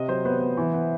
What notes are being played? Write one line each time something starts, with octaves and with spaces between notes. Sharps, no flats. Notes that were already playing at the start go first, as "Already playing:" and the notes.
Already playing: C3 D#5
F#3 C5
B3 C5
B3
E3
B3